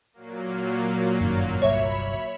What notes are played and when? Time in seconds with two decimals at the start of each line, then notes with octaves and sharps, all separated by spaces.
0.13 A#2 F#3 A#3
1.21 G1 F#2 D#3
1.62 G1 C2 C#5 E5 B5